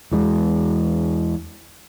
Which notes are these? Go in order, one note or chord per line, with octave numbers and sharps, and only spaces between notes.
E2 E3 G#3